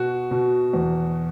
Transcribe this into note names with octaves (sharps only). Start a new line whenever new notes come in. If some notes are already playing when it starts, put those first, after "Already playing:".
Already playing: B2 F#4
B2
E2